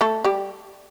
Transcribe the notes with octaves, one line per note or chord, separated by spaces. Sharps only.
A3 A4
G3 G4